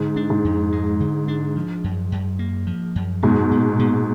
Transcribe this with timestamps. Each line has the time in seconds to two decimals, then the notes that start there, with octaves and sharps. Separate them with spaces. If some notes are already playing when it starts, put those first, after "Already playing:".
Already playing: G#2 D3
0.16 D4
0.30 G#2
0.44 F2
0.72 G#3
1.00 D3
1.28 D4
1.56 F3
1.84 F#2
2.12 F#2
2.39 A#3
2.67 F3
2.96 F#2
3.22 G#2 B2 G#3
3.51 A#2
3.79 A#2